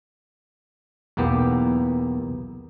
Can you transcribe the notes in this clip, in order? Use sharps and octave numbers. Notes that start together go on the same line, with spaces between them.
B1 E2 A#3 B3 G4